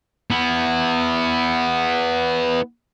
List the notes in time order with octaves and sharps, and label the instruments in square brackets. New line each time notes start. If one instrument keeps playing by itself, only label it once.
[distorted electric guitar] B3 E4